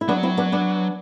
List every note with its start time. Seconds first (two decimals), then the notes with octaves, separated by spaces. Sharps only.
0.01 E4
0.08 F#3 B3 D4
0.23 C4 E4
0.37 B3 D4
0.52 B3 D4